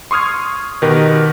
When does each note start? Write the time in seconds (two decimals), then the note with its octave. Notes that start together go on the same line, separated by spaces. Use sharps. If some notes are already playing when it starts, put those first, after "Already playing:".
0.11 C6 C#6 D#6 F6 G#6
0.82 B2 D#3 D#4 G4 A#4 B4